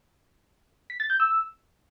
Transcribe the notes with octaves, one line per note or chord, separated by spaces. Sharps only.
B6
A6
G6
E6